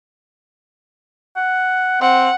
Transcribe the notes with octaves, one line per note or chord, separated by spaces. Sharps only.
F#5
C4 F#5